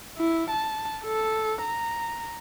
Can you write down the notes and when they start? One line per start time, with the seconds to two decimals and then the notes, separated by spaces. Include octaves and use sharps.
0.17 E4
0.50 A5
1.04 A4
1.61 A#5